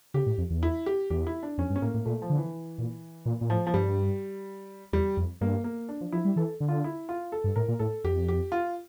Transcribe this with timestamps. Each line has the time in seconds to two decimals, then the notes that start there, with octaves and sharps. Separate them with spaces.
0.14 C#3 G4
0.27 A2
0.38 F2
0.50 E2
0.63 E4
0.86 G4
1.10 E2 G4
1.27 E4
1.43 D4
1.58 F2 C#4
1.70 G2
1.76 C#4
1.82 A2 A#3
1.94 A2
2.05 A#2 A3
2.22 F3
2.30 D3
2.38 E3
2.78 A#2
3.26 A#2
3.41 A#2
3.49 A2 F3
3.67 F3
3.74 G2 G3
4.93 E2 G3
5.17 F2
5.41 G2 A#3
5.64 A#3
5.89 D4
6.01 F3
6.12 F3 E4
6.25 G3
6.36 E3 A4
6.60 D3
6.68 F4
6.84 E4
7.09 F4
7.32 A4
7.44 G2
7.56 A2 A#4
7.68 A#2
7.79 A2 A4
8.04 F2 G4
8.28 G4
8.52 F4